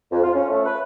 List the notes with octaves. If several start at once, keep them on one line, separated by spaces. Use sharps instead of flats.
F2
F4
C#4
A3
B4